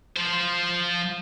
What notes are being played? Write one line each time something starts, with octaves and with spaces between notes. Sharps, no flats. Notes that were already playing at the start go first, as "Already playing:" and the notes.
F3 C5